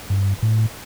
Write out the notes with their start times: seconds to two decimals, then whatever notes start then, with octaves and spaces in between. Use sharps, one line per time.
0.10 G2
0.43 A2